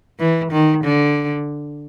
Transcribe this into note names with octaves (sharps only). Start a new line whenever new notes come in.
E3
D#3
D3